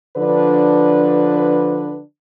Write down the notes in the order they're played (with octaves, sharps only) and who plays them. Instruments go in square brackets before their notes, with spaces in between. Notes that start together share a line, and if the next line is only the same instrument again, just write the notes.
[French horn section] D3 F3 D4 B4